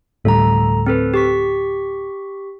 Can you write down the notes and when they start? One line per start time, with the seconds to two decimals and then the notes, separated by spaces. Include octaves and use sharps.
0.25 D2 A2 G3 A4 A#5
0.86 C4 A4 B4
1.14 G4 C#6 B6